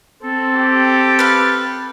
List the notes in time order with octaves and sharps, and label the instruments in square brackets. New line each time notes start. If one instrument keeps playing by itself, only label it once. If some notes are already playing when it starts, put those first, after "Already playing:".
[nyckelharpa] C4 [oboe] A4
[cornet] G4
[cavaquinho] B4 F5